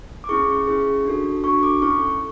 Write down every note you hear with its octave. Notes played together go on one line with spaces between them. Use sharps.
D6
C#4 E4 G#4 C#6
C#4 E4 G#4
D4 F#4 A4
D4 F#4 A4 C#6
D6
C#4 E4 A4 C#6